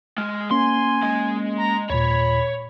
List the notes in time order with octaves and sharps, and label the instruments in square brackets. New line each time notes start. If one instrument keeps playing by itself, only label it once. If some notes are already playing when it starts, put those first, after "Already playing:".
[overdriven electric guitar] G#3 [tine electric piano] F6
[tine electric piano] A#3 C#4 [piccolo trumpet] G#5 [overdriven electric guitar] C6
[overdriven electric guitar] G#3
[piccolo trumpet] A#5
[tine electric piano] D#2 A#2 [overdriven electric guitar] C#5 [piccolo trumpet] B5